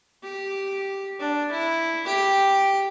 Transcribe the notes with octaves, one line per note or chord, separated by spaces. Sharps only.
G4
D4
E4
G4 G5